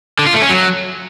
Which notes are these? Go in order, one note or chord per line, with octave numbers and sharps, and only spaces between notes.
D3
F4
A3
C#4
F#3